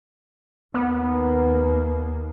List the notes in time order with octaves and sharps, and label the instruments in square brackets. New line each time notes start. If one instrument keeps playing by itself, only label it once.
[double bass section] D#2 A#3 [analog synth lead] B3